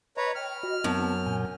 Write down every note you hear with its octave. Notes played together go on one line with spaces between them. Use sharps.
B4 C#5 D#5 A#5
G5 F6
F#4 D#5
F#2 B3 C4 A5
A#2 G#5 G6